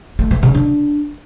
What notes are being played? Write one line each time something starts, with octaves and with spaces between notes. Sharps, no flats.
A3
E3
C#3
D4